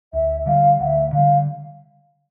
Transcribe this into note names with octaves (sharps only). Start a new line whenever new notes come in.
D2 E5
D3 G3 F5
D2 E5 F#5
D3 G3 F5